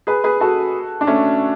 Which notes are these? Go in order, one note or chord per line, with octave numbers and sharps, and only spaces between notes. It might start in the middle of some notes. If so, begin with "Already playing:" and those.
G#4 B4
G#4 B4
F#4 A4
D4
A3 C#4